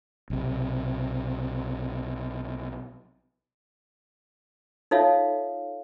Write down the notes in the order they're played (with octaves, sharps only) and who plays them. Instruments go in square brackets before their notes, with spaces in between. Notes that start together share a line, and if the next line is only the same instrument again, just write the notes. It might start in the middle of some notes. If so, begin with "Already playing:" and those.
[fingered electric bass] B1 C3
[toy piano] D#4 F4 A4 C#5 E5 F5